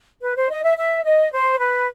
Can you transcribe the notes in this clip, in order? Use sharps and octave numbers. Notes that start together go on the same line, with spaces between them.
B4
C5
D#5
E5
E5
D#5
C5
B4